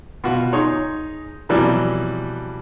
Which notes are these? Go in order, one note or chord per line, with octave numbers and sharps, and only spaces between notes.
B2 F4 F#4
D#4 G#4 C#5 C6
F2 B2 E3 F#3 G3